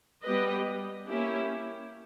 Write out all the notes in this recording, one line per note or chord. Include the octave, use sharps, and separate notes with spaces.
G3 B3 G4 B4 D#5
A#3 C#4 E4 G4